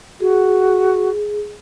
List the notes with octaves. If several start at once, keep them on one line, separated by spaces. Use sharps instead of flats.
F#4 G#4